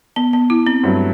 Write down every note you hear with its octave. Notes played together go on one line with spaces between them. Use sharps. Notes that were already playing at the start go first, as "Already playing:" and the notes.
B3
B3
E4
C4
G2 F#3 A3